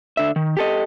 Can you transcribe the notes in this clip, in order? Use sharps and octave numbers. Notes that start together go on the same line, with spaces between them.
D3 E5
D#3
G4 A4 D#5